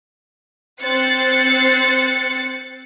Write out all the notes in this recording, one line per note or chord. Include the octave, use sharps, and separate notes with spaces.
C4 C5 F#6 A6 C#7